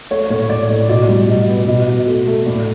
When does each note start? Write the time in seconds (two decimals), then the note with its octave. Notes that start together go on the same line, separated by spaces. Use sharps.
0.11 A3 C#5
0.30 A2 C#5
0.50 A2 D5
0.69 A2 D5
0.89 B2 D5
1.08 G3
1.29 B2
1.48 B3
1.68 B2
1.87 B2
2.07 A3
2.27 A3
2.46 A2 D5